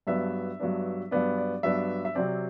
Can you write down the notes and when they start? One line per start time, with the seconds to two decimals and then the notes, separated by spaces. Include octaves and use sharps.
0.07 G2 F#3 B3 D4 E5
0.60 G2 F#3 B3 D4
1.11 G2 F#3 B3 D4 D5
1.37 D5
1.63 G2 F#3 B3 D4 E5
2.05 E5
2.15 C3 F#3 C4 D5